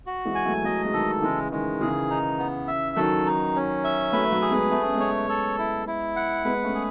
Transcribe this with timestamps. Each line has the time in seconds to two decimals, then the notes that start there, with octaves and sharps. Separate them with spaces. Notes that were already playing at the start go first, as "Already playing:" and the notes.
0.07 F#4
0.25 E3 G#3
0.35 G#5
0.45 F#3 A3
0.64 F#3 A3 D#5
0.85 G#3
0.93 D#3 F#3 A4
1.18 D#3
1.22 C#3 E3 G#3
1.52 D#3 G#3
1.81 C#3 E3 G#4
2.10 D#4
2.39 B3
2.68 E5
2.96 D#3 F#3 A4
3.26 D#4
3.55 C#4
3.84 E5
4.12 F#3 A3 B4
4.32 F#3 A3
4.41 G#4
4.51 G#3 B3
4.71 A3 B3
4.83 C#4
4.95 G#3 B3
5.00 C#5
5.29 A4
5.58 E4
5.87 E4
6.16 F#5
6.45 G#3 B3 B4
6.64 A3 C#4
6.74 G#4